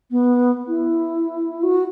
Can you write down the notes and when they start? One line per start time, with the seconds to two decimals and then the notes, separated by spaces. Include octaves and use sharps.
0.11 B3
0.68 E4
1.63 F#4